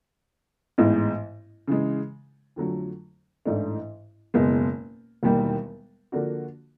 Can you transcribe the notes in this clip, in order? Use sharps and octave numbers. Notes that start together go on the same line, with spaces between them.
A1 G#2 E3 G#3 B3
C#3 E3 G#3
F2 D3 F#3 A3
A1 G#2 E3 A3 D4
F#1 E2 B2 G#3
E1 D#2 D#3 G3
D3 F3 A#3 D4 F#4